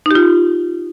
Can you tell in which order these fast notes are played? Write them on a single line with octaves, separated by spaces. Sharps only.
D#4 G4 F4